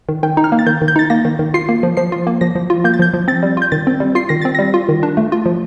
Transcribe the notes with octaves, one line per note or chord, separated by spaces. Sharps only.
D#3
D#3 G5
D#4
F6
A#3
A6
D#3 G6
D#3
G6
D#4 A6
A#3 A#6
D#3
D#3
F4 C7
A#3
F3
F3 C7
F4
A#3
F3 A#6
F3
F4
A#3 G6
A6
F3 G6
F3
C4 A6
G3
F4 G6
D#3 A6
C4
G3
F4 C7
D#3 A#6
C4 A6
G3 A#6
F4
D#3
D4
A3
F4
F3